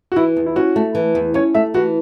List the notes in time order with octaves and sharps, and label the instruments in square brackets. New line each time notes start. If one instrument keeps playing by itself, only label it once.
[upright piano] F#4
[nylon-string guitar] E3 [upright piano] E4
[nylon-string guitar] E2
[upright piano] E4
[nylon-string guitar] C#4 [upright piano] F#4
[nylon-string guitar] A3
E3
E2
[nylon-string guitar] C#4 [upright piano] C#5
[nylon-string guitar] A3 [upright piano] E5
[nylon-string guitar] E3 [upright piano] F#4